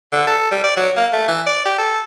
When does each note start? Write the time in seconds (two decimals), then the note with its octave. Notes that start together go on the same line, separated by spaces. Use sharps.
0.12 D3
0.27 A4
0.51 G3
0.63 D5
0.77 F#3
0.97 A#3
1.13 A3
1.28 E3
1.46 D5
1.65 G4
1.78 A4